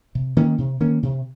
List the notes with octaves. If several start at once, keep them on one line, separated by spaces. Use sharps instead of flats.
C3
D#3 A#3 C#4
C3
D#3 A#3 C#4
C3